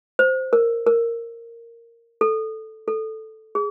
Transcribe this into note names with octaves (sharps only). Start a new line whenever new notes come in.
C5
A#4
A#4
A4
A4
G#4